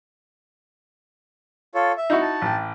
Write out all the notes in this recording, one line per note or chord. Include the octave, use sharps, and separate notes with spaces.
F4 A4 C#5
E5
D#4 E4 F#4
A5
A1 G5